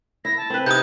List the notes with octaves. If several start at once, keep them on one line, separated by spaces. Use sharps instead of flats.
E4 A#6
A5
C4 B4
C3 B3 D#4 D#6 G6 G#6